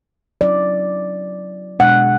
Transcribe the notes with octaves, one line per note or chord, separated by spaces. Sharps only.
F#3 C#4 E4 D5
B2 G#3 D4 F#5